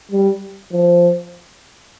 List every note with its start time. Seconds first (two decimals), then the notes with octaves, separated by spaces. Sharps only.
0.11 G3
0.72 F3